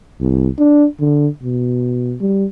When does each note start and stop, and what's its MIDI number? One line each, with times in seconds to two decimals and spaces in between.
0.21 0.48 36
0.59 0.85 62
1.00 1.27 50
1.43 2.15 47
2.20 2.45 55